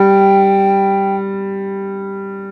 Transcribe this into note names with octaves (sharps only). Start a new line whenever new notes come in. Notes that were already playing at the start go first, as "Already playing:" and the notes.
Already playing: G3 G5